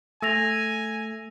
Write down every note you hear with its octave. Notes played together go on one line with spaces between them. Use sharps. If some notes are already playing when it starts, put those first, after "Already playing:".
A3 G#5 E6 A#6 F7